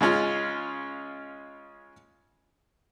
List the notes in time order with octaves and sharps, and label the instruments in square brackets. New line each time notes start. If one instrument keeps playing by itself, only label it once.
[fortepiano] C#3 G#3 C#4 F4